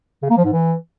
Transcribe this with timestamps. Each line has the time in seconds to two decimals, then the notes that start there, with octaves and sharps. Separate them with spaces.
0.22 C#3
0.30 A#3
0.37 F3
0.45 G#2
0.52 E3